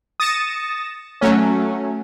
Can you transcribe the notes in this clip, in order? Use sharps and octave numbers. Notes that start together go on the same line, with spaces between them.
D#6 A6 A#6 C#7 E7
F#3 A3 C#4